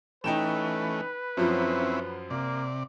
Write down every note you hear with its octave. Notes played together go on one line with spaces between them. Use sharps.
E3 A3 C#4 D#4 B4 G5 E7
F#2 F3 F#3 C4 C#4 E4
C3 A#3 D5